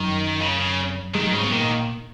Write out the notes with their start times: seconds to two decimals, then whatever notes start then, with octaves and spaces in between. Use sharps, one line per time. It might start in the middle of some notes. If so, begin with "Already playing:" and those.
Already playing: F#2 D#3 F#3
0.41 C#3
0.60 C#3
1.14 D#3 G#3
1.23 F#3
1.32 G#2 C#3 G#3
1.43 B3
1.51 A#2 D#3 A#3